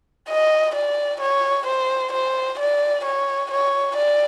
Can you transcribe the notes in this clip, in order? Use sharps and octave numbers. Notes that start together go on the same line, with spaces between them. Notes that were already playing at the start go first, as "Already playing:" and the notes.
D#5
D5
C#5
C5
C5
D5
C#5
C#5
D5